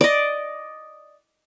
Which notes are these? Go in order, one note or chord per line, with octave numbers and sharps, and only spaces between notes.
D5 D#5